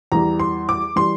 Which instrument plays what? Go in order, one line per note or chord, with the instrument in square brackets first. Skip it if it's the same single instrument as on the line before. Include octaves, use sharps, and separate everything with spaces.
[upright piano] E2 E3 G3 A#5
C6
D6
E3 G3 C6